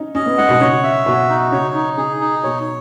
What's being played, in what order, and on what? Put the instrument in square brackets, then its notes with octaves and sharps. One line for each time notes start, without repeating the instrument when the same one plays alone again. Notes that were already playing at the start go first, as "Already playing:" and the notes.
Already playing: [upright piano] C#4 D#4
[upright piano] C#4 [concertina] D#5
[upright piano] B3
[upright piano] G#3 [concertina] F#5
[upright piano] B2
[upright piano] C#3 [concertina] C#5
[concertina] E5
[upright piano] B2 [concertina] F#4
[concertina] D#4
[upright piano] C#3 [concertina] C#5
[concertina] D#4
[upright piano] C#3 [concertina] G#4
[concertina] D#4
[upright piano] B2 [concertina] C#5